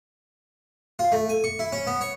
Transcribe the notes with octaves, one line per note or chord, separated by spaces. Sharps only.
F4
A3
G#5
C#6
E4
C#4
B3
C#5